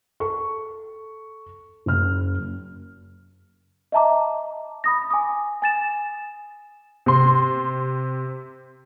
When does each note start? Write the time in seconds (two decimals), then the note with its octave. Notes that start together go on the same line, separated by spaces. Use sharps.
0.20 A4 C#6
1.86 F#1 F6
3.92 D#5 E5 A5 A#5 D6
4.84 B5 D#6 A#6
5.11 G#5 D6 D#6
5.62 G#5 A6 E7
7.06 C3 C6